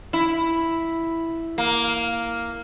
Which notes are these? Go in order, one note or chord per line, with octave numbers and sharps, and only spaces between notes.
E4
A#3